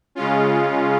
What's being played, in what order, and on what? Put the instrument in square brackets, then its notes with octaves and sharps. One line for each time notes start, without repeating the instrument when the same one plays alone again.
[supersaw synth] C#3 G#3 C#4 F4